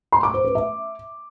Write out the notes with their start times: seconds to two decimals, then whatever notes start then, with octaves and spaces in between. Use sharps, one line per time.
0.12 C6
0.23 D6
0.34 C5
0.45 B4
0.55 E5